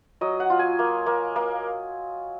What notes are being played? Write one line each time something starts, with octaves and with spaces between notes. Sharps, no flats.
F#3 D#5
F#5
F4
G#5
A#3
A#3
A#3